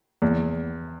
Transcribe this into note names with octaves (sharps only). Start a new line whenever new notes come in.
E2